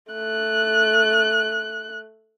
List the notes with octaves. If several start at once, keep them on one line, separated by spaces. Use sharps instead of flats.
A3 F#6